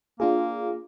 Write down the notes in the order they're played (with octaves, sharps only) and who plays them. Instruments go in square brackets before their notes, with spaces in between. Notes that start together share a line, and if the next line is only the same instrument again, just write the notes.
[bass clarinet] A#3 [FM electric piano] D4 F4 G#4